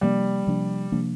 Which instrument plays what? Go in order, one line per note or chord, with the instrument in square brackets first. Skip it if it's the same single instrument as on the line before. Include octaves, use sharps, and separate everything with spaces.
[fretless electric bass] C3 F3 A#3 D4 [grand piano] G3
[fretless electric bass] C3 F3 A#3 D4
C3 F3 A#3 D4